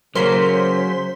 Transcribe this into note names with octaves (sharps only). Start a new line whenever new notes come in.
C#3 F#3 A#3 C#4 A#4 C5 C6 B6